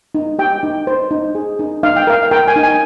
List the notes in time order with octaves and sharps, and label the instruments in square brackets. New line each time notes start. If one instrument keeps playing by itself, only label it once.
[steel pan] D#4
G4 G5
D#4
C5
D#4
G#4
D#4
D#4 F5
G5
A#4 F5
A#4 G5
G#5
D#4
G#5